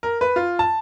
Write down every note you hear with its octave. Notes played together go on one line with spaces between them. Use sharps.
A#4
B4
F4
A5